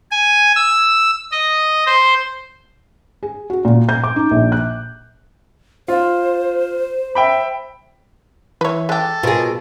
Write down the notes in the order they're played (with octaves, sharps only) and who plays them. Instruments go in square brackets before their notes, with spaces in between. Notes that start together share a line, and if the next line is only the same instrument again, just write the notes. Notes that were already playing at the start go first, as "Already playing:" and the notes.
[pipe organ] G#5
E6
D#5
C5
[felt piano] G#4
F#4
A#2
G6
D6
D#4
A#1
F#6
[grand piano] F4 [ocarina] C5
[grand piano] E5 G5 B5
[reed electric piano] E3 E5 [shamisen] B4 C#5
[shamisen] G#3 G4 [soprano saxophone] A4
[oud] B2 G#4 [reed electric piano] F4 A#4 C5